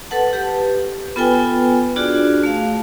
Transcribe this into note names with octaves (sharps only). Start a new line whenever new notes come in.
A4 B4 F#5 A5
G4 B4
B3 F4 A4 B4 G5 G#5
D4 F4 F#4 G#4 D5
A3 F5